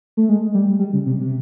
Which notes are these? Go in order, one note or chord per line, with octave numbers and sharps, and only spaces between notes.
A3
G#3
G3
G3
C#3
C3
C3